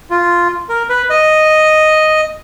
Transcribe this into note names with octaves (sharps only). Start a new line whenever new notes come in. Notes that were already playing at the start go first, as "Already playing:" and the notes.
F4
A#4
B4
D#5